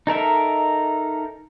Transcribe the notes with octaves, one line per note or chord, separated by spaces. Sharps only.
D#4 A4 A#4 E5